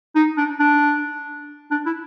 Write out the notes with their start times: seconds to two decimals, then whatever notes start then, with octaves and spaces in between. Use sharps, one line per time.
0.15 D#4
0.37 D4
0.60 D4
1.71 D4
1.86 E4